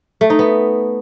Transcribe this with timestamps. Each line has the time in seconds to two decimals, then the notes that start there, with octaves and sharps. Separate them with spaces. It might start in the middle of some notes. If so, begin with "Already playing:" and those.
0.21 A3
0.30 D#4
0.39 B3